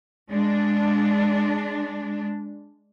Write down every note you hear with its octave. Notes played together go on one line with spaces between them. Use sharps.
G#3 D4